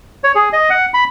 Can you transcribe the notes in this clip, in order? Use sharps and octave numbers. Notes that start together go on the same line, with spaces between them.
C#5
G#4
D#5
F#5
B5